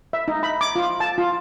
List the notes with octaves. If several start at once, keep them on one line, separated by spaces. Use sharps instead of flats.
E5
D#4
B5
D6
F4
A5
F4